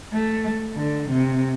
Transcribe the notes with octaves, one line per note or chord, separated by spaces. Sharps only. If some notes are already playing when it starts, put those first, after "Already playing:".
A3
D3
C3